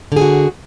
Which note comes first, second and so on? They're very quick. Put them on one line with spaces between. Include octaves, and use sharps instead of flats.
D3 G#4 F#4